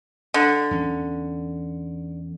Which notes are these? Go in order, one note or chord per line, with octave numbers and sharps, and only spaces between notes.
D3
E2 C#4